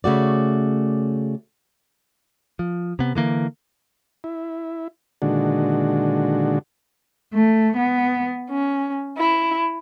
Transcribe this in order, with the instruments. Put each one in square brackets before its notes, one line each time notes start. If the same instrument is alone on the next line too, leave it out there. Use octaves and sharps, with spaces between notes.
[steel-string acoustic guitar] C#3 A3 F#4 D5
[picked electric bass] F3
C3 B3
D3 E3 A#3
[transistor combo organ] E4
A#2 D3 D#3 G#3 D4 F#4
[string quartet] A3
B3
C#4
E4